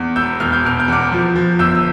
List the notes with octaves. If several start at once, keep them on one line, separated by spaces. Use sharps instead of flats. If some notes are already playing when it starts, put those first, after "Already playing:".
Already playing: E2
E1 E6 G6
E1 F6
G6
B2 F6
G6
E2 D6 F6
F3
F3
G1 E6 G6
E6